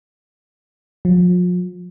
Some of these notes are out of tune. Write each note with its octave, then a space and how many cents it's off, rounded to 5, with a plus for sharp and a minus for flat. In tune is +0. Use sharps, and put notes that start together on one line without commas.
F3 +40